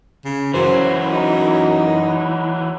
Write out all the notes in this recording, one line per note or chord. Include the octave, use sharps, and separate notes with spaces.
C#3
F#2 E3 F#3 C5
D#4